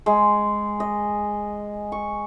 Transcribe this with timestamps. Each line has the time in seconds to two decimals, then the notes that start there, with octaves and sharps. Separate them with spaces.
0.06 G#3
0.80 D#5
1.92 C#6